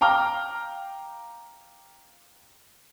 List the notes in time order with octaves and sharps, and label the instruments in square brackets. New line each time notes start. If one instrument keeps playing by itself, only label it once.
[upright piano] F5 G5 A#5 D6 F6